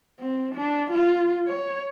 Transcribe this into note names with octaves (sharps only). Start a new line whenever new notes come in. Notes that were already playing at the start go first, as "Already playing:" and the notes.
C4
D4
F4
C#5